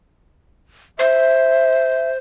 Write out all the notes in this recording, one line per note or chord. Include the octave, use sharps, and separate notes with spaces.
C5 E5